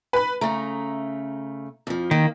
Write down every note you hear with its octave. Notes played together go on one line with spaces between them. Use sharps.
B4 B5
C#3 A3 A#5
F2 F3
D#3 A#3